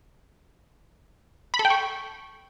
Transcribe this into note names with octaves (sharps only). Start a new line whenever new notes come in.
B5
A4
G5
C#6